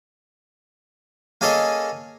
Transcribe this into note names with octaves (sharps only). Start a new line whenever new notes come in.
A#3 C#4 G#4 A4 C#5 D#5